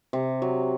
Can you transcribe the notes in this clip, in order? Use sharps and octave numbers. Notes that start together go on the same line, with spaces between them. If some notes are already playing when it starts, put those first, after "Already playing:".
C3
F#3